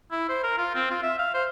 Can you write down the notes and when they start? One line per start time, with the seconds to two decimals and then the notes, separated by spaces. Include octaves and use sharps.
0.11 E4
0.29 C5
0.43 A#4
0.58 F4
0.75 C4
0.91 F4
1.03 E5
1.19 F5
1.34 C5